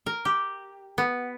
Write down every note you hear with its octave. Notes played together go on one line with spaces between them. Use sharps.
A#4
G4
B3